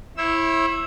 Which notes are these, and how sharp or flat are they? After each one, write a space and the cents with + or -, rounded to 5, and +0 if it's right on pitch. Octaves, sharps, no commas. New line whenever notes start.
E4 +0 C#5 -45 E6 +0